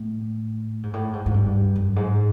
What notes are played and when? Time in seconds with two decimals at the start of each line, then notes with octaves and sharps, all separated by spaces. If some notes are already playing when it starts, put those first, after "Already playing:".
Already playing: A2
0.83 G#2
0.93 A2
1.13 G#2
1.26 G#2
1.34 G2
1.76 F#2
1.96 G#2